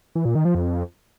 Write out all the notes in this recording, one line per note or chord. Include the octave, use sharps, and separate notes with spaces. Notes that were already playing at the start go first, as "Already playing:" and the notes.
E3
A#2
D#3
F3
F2